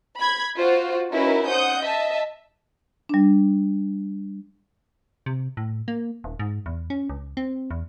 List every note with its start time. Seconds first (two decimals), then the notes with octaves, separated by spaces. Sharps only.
0.18 B5 G#6
0.57 F4 F#4 C5
1.14 C#4 D#4 E4 F#4 A#4 B4
1.46 C5 F#5 D#6 G6
1.81 D#5 E5 A5
3.09 G3 D4
5.26 C3
5.57 A2
5.88 A#3
6.24 D#1
6.39 G#2
6.66 E2
6.90 C#4
7.09 C#2
7.37 C4
7.71 E2